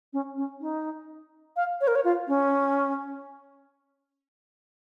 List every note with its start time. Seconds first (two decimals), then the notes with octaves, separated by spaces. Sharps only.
0.13 C#4
0.37 C#4
0.61 D#4
1.56 F5
1.81 C#5
1.87 A#4
1.95 C#5
2.04 F4
2.28 C#4